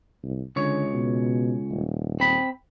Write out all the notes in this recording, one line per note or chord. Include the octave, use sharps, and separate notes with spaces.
C2
C#2 D3 C#5
B2
D#1
C4 B5